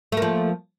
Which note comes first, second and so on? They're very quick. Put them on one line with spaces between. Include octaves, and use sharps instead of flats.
A3 A#3 F3